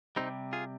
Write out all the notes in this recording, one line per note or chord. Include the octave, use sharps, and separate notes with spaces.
C3 G3 C4 D#4
F4 G#4